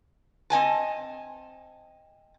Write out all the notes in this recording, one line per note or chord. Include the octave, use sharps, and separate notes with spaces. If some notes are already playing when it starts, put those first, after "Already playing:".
C4 D#5 G#5 A5